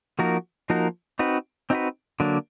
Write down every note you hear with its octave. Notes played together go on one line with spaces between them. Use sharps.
F3 A#3 D#4 F#4 A#4
F3 A#3 D#4 F#4 A#4
C4 D#4 F#4 B4
C4 D#4 F#4 B4
D3 F#3 A#3 D4